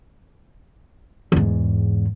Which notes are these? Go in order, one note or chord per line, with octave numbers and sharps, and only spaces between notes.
E2 G#2